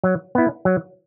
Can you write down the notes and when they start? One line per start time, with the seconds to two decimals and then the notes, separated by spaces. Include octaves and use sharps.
0.04 F#3
0.35 B3 E4
0.65 F#3